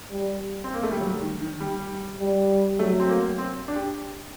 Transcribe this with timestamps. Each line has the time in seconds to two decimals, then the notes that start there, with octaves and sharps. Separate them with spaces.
0.12 G3
0.64 C4
0.74 A#3
0.83 A3
0.91 G3
1.01 F#3
1.22 D#3
1.41 D#3
1.61 G3
2.20 G3
2.79 F#3 A3
3.00 C4
3.09 A#3
3.38 C4
3.68 D4
3.76 G4